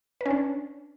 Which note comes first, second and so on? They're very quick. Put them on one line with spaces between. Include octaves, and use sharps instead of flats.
B4 C#4 D4